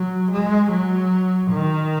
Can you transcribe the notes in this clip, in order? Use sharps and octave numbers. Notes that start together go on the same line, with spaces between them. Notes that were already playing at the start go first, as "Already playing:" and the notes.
Already playing: F#3
G#3
F#3
D#3